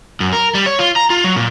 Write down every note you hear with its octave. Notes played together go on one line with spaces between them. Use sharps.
F#2
A#4
G3
C#5
F4
A#5
F4
F#3
A#2